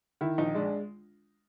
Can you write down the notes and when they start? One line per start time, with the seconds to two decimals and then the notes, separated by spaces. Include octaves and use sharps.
0.21 D#3 E4
0.38 A#1 D#4
0.55 G#3 D4